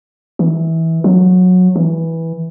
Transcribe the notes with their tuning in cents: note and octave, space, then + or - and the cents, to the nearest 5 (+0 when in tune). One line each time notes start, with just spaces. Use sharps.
E3 -20
F#3 -20
E3 -10